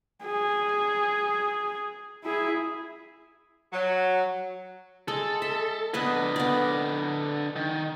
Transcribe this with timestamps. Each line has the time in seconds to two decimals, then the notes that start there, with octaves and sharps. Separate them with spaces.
0.25 G#4
2.24 E4 G#4
3.73 F#3
5.08 G#3 A4
5.42 E5
5.94 D3 B3 D4 B4 D#5
6.36 B3 D5
7.56 D#3